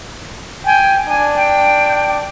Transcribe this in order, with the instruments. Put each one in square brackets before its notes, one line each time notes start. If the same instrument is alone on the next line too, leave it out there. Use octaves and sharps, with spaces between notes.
[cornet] G5 [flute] G#5
[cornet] D4 [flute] G#5
[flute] G5